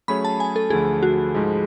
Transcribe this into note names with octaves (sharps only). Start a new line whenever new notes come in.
F#3 A3 C#4 G#4 C#5 B5
A5
G#5
A4
D2 D3 F3 A3 G#4
F#4
G#2 F3 G#3